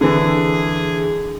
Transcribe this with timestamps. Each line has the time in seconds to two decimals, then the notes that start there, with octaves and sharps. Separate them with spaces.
0.01 D3 E3 G#4